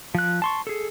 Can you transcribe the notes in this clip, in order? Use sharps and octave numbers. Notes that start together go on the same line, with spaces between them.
F3 F#6
A5 C6 C#6
G#4 A4